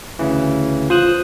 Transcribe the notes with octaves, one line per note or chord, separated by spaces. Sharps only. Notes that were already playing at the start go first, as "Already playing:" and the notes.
D2 C#3 E3
F4 C5 D#6 F#6